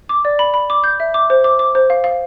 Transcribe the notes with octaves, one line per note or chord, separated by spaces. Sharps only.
D6
D5
B5
B5
D6
G6
E5
D6
C5
D6
D6
C5
F5
F5